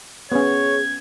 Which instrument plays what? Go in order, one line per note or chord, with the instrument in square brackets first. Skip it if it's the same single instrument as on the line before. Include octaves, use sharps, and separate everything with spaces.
[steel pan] B3 C#4 [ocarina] G#4 [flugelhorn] C#5 [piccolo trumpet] G#6